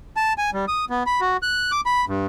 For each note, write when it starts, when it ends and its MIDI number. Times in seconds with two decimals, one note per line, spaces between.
0.17 0.33 81
0.38 0.50 80
0.54 0.65 55
0.68 0.85 87
0.90 1.03 59
1.06 1.20 83
1.21 1.37 66
1.43 1.71 90
1.72 1.81 86
1.86 2.05 83
2.08 2.27 43